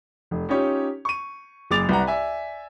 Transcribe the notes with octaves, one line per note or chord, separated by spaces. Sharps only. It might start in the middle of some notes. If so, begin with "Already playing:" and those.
F1
C#4 D#4 F4 G4 C#5
C#6 D#7
F#1 G#4 D6 A6 F7
C2 B4 F#5 A#5
D5 E5 G#5